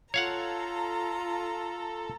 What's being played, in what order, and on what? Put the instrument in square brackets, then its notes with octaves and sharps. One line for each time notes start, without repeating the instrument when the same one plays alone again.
[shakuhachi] F4 [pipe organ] A4 [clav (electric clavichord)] C#5 F5 F#5 [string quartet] A#5